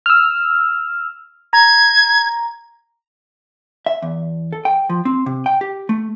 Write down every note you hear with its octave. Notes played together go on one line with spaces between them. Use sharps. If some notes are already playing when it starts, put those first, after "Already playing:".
E6 F6
A#5 G#6
E5
E2
A4
G5
F3
C4
C3
G5
G4
A3